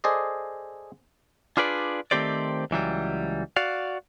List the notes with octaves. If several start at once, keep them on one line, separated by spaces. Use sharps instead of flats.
G#4 A4 C5 D5 D#5
D4 F4 G#4 B4 D5
D#3 A3 C4 G4 C5 D5
C#2 E3 F#3 G3
F#4 D5 F5